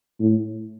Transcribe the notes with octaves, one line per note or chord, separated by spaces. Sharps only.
A2